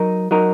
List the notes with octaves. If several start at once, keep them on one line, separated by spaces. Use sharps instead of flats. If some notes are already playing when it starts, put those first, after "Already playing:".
Already playing: F#3 D#4 A#4
F#3 D#4 A#4